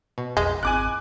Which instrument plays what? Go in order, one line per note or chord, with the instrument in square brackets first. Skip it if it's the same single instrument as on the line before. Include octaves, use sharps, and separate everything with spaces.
[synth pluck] B2
[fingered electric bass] B1 F2 [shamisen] G#3 [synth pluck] D#5
[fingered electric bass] G#1 C4 [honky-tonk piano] G#5 D6 F#6